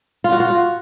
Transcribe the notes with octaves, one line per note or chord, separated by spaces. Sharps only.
F4
F#4
F4
F#4